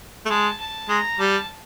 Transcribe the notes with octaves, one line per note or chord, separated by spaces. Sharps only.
A3
G#3 A5
A5
G#3 A#5
G3 A5